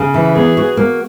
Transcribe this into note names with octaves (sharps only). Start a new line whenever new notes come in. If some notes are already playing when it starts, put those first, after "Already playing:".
Already playing: C#3
E3
B3 G#4
F#4
A#3